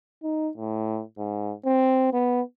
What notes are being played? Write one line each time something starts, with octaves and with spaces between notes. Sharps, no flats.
D#4
A2
G#2
C4
B3